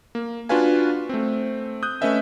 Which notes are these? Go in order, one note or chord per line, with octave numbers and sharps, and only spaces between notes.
A#3
D4 F4 F#4 B4 F5 G#5
A3 C4
D#6 F#6 G6
A3 C#4 B4 D#5 E5 G#5